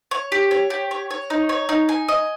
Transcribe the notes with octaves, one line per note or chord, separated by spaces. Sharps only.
C#5
G4
C#5
G4
C#5
C#5
D#4
C#5
D#4
G#5
D#5